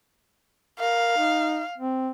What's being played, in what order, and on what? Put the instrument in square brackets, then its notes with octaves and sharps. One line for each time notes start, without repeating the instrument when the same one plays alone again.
[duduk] A#4 [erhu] F5
[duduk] D#4
C4